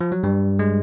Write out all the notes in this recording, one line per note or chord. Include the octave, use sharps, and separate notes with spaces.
F3
F#3
G2 G3
G#3